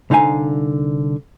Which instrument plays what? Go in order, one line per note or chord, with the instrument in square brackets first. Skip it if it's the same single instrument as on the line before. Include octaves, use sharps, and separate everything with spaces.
[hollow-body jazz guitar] C2 D3 D#4 F5 G#5